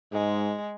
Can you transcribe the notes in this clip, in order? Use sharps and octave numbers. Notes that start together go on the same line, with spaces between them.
G#2 G#3